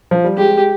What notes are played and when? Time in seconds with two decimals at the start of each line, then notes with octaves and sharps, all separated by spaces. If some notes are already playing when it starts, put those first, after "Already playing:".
0.11 F3
0.24 G3
0.37 G#3 G4